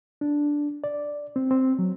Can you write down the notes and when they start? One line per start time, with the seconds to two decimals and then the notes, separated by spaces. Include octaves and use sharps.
0.21 D4
0.84 D5
1.36 C4
1.51 C4
1.79 F#3